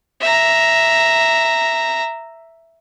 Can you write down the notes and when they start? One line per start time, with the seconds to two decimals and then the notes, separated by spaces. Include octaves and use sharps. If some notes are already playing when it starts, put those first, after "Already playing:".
0.21 E5 A#5